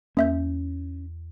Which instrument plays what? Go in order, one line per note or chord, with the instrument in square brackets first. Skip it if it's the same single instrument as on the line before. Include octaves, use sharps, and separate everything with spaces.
[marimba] E2 [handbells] A#3 E5 G6 [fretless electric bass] C#4